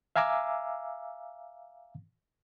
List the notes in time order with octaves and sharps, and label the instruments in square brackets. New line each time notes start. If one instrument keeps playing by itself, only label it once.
[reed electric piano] E5 F5 G#5 A#5 D6 E6